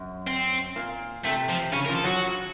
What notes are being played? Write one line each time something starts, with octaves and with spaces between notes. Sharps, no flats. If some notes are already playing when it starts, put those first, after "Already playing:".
Already playing: F#2
C4
A#2
C3 A3
F3
C#3 C#4
A#4
F3
A4
F#3 F#4